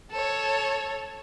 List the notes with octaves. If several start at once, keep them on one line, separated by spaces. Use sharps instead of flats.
A4 C#5